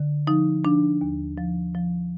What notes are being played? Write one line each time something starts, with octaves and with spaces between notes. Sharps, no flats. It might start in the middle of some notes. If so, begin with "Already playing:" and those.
Already playing: D3
F3 D#4
F3 D4
D#2
F3
F3